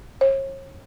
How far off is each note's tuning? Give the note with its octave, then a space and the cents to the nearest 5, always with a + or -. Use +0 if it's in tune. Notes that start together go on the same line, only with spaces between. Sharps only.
C#5 -40